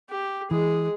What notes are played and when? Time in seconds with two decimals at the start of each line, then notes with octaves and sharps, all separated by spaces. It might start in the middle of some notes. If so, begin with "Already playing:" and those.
0.10 G4
0.51 E3 G#3 G#4